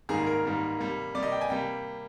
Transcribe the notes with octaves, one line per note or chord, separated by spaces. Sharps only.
G#2 D#3 G3 A#3 G#4
A#4
G#2 D#3 G3 A#3
C3 G3 A#3
C3 G3 A#3 D5
D#5
G5
G#5
C3 G3 A#3 G5